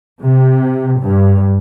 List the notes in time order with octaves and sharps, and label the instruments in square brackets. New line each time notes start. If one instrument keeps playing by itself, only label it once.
[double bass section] C3
G2